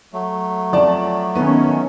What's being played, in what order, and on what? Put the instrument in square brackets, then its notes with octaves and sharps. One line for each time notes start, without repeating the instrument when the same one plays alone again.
[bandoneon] F#3 A3
[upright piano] F2 D5 A5
[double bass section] D#3 C#4 [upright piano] B3